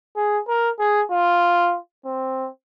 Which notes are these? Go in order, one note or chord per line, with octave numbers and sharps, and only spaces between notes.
G#4
A#4
G#4
F4
C4